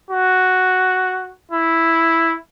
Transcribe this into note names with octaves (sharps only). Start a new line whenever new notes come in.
F#4
E4